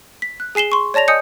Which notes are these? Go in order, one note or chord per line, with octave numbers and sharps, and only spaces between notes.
B6
F#6
G#4 G#5 C7 E7 G7
C6 C#6
C#5 D5 A5 A#6 F7
D#5 G#5 D#6 G6 C#7